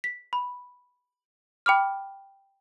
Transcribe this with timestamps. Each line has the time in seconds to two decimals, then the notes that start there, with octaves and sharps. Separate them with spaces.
0.04 B6
0.33 B5
1.66 G5 B5 D6 F6